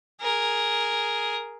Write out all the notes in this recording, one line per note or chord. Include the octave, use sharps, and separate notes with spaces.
G#4 A#4